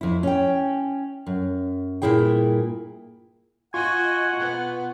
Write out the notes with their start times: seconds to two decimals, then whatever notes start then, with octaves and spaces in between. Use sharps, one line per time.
0.01 F2 E4
0.23 C#4 G5
1.27 F#2
2.02 G2 A#2 A#3 E4 G#4 G5
3.74 F4 F#4 D#5 F#5 G#5 C6 C#6
4.37 B2 B3